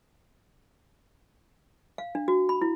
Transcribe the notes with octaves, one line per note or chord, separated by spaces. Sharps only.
F5
D4
F#4
B5
E4